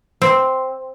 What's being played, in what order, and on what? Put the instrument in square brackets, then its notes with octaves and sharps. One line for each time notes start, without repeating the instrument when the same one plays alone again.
[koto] C4